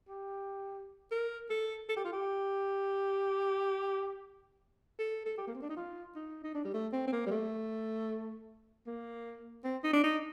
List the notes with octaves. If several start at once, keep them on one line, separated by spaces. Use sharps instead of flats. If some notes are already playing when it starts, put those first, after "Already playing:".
G4
A#4
A4
A4
G4
F4
G4
A4
A4
G4
A#3
C4
D4
D#4
F4
D#4
D#4
D4
G3
A3
C4
C4
A#3
G3
A3
A#3
C4
D#4
D4
D#4